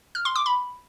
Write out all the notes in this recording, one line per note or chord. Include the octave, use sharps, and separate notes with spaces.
F6
C6
D6
B5